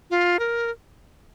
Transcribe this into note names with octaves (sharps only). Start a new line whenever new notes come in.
F4
A#4